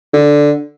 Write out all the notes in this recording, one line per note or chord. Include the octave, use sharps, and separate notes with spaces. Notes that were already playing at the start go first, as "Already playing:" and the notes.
D3